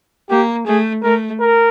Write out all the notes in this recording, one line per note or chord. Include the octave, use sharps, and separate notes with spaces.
A#3 G4
A3 G#4
A3 A#4
A#4